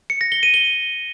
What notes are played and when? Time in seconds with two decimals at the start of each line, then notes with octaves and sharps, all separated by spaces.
0.10 C#7
0.21 A#6
0.32 G7
0.43 D#7
0.54 G7